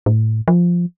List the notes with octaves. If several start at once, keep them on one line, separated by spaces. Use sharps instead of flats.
A2
F3